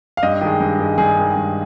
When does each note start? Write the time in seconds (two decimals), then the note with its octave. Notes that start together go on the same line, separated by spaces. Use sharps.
0.17 F5
0.23 G2 D#5
0.41 D#3 G#3
0.60 G2
0.79 D#3 G#3
0.98 G2 G#4
1.17 D#3 G#3
1.36 G2